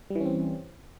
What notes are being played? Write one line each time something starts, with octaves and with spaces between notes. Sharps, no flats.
E3 G3 C4 C#4